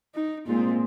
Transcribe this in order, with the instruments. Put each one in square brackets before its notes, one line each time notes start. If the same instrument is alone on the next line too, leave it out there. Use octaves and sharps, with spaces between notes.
[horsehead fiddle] D#4
[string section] A#2 G#3 C4 [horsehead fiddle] F4